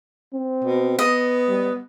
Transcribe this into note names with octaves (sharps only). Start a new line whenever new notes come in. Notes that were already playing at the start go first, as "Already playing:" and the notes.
C4
B2
B3 D#5
G3